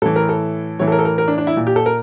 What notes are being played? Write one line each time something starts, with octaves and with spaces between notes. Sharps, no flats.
A2 E3 A4
A#4
A4
A2 E3 C#5
A4
A#4
A4
A#4
A#4
D4
D4
E4
A#2
G4
A4
A#4